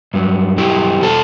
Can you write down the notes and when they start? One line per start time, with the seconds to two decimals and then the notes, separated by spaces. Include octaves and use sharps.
0.14 G2 F#3
0.58 E4 G4
1.02 B2 G3 A4 C5